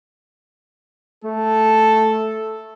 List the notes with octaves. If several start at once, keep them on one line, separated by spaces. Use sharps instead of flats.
A3 A4